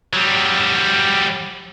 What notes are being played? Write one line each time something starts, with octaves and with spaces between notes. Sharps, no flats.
F#3 G3